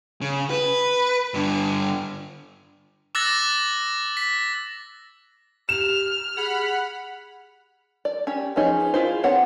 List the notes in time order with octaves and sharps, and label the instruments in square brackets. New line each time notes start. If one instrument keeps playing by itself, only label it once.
[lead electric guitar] C#3
B4
G2 D3
[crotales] D6 E6 F#6 A6 A#6
B6
[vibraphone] G4 [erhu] F6 [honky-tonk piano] E7
[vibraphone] G#4 [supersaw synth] F#5 B5
[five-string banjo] D5
C#4 G4
F3 B3 C#4 D#4 G#4
E4 F4 G#4 C5
B3 C4 D4 C#5 F#5